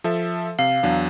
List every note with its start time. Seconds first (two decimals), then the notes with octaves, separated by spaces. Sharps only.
0.04 F3 A4 E5
0.59 C3 F5
0.83 E2 F#3 D4